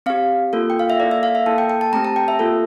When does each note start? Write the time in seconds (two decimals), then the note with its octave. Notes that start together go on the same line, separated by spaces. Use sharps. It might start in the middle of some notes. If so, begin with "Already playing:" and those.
0.06 C4 G4 F5
0.53 A#3 F4 A4
0.70 G5
0.79 F5
0.90 E5
1.00 A#3 E4 A4 D5
1.11 E5
1.23 F5
1.35 E5
1.46 A#3 E4 A4 A5
1.58 G5
1.70 G5
1.81 A5
1.93 A3 C4 G4 A#5
2.05 A5
2.16 G5
2.28 E5
2.39 A#3 F4 A4